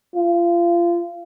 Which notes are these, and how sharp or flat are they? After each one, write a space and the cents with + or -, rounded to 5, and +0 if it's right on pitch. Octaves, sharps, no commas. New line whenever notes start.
F4 -25